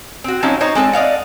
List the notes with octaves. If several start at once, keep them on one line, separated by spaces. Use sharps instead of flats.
C4 F#4
F3 F#3 C4 C#4 D#4
D#4 C5 C#5 D#5 A#5
G#3 C4 A4
D5 D#5 F5 F#5